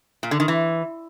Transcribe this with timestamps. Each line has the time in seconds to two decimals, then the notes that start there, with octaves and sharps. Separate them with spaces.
0.23 A#2
0.31 D3
0.40 D#3
0.48 E3